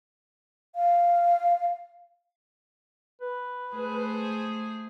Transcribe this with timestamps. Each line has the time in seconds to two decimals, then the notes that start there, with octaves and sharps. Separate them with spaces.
0.76 F5
3.22 B4
3.75 A3 G#4 C5